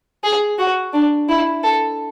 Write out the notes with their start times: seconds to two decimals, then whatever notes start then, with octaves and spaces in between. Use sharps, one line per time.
0.24 G#4
0.58 F#4
0.93 D4
1.29 E4
1.63 A4